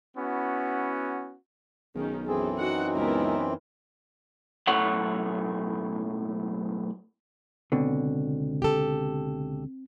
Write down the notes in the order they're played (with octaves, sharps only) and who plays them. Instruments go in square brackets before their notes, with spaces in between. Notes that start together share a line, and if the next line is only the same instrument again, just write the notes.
[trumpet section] B3 C#4 E4 F#4
[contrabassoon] B1 [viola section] D#3 C#4 D#4 [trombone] G#4
[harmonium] F#2 E3 C4 [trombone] G#4 [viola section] A4
[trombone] D#4 [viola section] F#4 F#5
[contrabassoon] C#2 [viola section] B3 E4 A#4
[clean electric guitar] B1 F#2 A2 A3 C#5 F#5
[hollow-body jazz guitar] C#2 B2 D3 [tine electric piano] C4
[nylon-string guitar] G4 A4